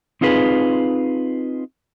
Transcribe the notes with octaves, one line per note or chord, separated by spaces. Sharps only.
C4 D#4 F4 G#4 B4